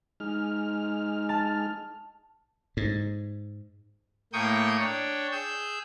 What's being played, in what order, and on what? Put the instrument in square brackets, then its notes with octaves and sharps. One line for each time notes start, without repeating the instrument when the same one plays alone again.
[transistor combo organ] G#3 D#4 F6
[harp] A5
[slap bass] G#2
[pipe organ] A2 A#3 G5 C#6 D#6 G6
D4 C#5 G5
G#4 E6 G6